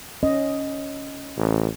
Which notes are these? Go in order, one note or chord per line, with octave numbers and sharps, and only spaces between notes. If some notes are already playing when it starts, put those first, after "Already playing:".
C#4 D#5
A1